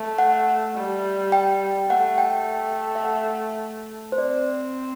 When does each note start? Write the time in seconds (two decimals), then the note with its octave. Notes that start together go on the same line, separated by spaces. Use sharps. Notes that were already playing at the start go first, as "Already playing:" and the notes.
Already playing: A3
0.19 F#5
0.75 G3
1.32 G5
1.90 A3 F#5
2.18 G5
2.47 G5
2.95 E5
3.04 F#5
4.12 C5
4.18 C4 D5